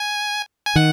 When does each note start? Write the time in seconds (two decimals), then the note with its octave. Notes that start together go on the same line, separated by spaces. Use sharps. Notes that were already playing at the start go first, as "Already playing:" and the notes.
Already playing: G#5
0.66 G#5
0.76 D#3 F#5